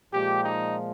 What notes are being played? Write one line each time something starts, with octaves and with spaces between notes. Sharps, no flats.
A#2 F3 G#3 G4
D#4